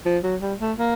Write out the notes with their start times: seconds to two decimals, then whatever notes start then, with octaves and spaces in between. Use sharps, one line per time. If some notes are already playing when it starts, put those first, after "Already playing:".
0.05 F3
0.23 F#3
0.41 G3
0.60 A3
0.78 A#3